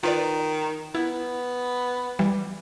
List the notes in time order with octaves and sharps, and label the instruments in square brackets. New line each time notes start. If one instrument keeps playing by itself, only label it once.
[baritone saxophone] D#3 [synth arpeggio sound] F4 B4 D5
[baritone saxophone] B3 [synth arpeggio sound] E4
[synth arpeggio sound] E3 G3